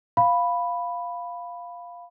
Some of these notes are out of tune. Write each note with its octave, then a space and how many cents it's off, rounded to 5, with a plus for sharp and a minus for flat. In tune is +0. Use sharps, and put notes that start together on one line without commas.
F5 +0 B5 +0